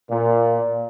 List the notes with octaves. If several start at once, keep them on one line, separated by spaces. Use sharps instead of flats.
A#2